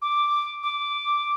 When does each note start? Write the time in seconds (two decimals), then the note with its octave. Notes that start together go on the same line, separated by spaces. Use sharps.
0.02 D6
0.63 D6